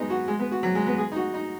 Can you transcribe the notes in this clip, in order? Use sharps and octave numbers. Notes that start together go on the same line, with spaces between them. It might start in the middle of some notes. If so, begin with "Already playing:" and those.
Already playing: F#3 G#3 B3 D#4
F#4
G#3
B3
F#4
F#3
G#3
B3
G#4
D#4
F#4
D#4